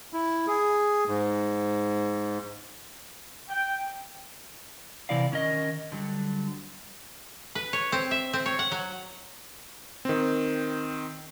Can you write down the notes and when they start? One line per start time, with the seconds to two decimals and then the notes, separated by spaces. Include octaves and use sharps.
0.13 E4
0.47 G#4
1.07 G#2
3.49 G5
5.09 C3 D#3 E3 E4 D5 F5
5.32 D#3 C#4 A#4 D#5
5.92 D3 F#3 G3
7.55 B4
7.73 C#5
7.92 C4
8.11 E5
8.33 C4
8.46 C#5
8.59 F#5
8.72 F#3
10.05 D#3 C4